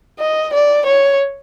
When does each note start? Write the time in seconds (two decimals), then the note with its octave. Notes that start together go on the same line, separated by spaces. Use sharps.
0.19 D#5
0.53 D5
0.86 C#5